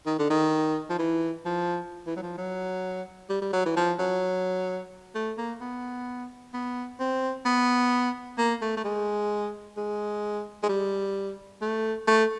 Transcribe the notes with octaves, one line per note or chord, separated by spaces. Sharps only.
D#3
D3
D#3
F3
E3
F3
E3
F#3
F3
F#3
G3
G3
F#3
E3
F3
F#3
A3
A#3
B3
B3
C4
B3
A#3
A3
A3
G#3
G#3
G#3
G3
A3
A3